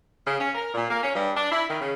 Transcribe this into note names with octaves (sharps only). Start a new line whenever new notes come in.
C#3
C#4
A#4
A#2
A#3
C#4
G2
D4
E4
D#3
C#3